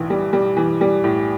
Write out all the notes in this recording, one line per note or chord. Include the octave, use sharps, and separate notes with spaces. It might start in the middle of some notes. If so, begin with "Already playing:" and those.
Already playing: B1 A2 E3
G3
G3
E3
G3
A2